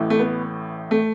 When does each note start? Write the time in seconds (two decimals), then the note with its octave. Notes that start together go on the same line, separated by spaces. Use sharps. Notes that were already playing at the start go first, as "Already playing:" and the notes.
Already playing: A1 A2 E3
0.10 A3
0.19 B3
0.91 A3